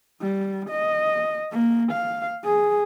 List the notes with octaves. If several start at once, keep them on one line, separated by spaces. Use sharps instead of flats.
G3
D#5
A#3
F5
G#4